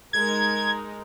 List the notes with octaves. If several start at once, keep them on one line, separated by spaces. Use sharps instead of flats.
G#3 D#4 A#4 G#6